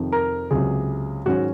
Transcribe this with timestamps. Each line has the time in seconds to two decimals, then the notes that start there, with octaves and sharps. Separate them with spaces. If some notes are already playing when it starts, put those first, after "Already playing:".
Already playing: F2 C3 D#3
0.12 A#4
0.51 C#2 C3 F#3 G#4
1.25 G#2 D#3 F#3 C#4 F#4